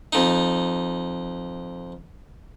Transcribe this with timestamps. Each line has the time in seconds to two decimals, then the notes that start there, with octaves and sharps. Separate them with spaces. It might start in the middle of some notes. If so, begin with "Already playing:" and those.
0.13 F2 D#4